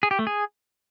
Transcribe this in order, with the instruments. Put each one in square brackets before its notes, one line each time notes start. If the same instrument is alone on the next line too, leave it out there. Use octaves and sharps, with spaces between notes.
[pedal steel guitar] G#4
G4
A3
G#4